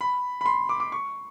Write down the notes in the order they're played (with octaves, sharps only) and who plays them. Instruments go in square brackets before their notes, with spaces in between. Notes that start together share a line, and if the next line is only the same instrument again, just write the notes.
[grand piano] B5
B5
C6
D6
D6
C#6